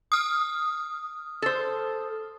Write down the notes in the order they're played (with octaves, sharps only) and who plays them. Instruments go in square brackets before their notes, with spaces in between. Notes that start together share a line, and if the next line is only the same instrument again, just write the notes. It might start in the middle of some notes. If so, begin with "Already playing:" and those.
[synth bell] D#6 F6
[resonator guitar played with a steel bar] A4 C5